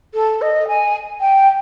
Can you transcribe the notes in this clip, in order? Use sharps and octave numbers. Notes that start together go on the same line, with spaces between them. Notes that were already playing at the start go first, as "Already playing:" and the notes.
A4
D#5
G#5
G5